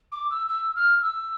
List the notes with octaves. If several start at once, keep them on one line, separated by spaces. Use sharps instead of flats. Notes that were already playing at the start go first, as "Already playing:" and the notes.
D6
E6
E6
F6
E6